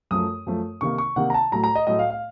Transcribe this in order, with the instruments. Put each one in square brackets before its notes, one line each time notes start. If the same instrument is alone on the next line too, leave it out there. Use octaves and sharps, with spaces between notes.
[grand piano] F#2 F3 A3 D#6
F#2 F3 A3
C3 D#3 A#3 C#6
C#6
C3 D#3 A#3 F#5
A#5
A5
A2 F#3 A3 A#5
A#5
D#5
A2 F#3 A3 D#5
F5
F5